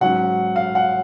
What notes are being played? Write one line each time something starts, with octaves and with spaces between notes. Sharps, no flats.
G#2 F#3 C#4 F#5
F5
F#5